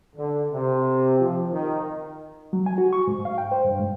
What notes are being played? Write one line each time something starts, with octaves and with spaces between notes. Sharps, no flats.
D3
C3
F3
D#3
F#3
G#5
F#4
C#6
G#2
F5
G5
C5
G2
G#2